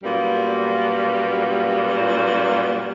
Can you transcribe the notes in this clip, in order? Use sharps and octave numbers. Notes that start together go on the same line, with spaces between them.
F#2 A#2 G3 A#3 B3